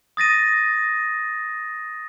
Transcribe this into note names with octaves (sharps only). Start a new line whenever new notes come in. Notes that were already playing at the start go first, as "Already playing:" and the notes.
D#6 A6 A#6 D#7